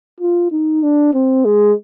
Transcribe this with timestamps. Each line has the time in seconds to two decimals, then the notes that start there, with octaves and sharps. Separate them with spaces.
0.20 F4
0.52 D#4
0.83 D4
1.13 C4
1.45 G#3